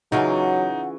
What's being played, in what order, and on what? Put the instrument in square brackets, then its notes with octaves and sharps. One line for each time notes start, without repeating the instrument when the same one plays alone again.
[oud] C#3 E3 F4 [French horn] F#3 [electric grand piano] D#4 [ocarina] F#5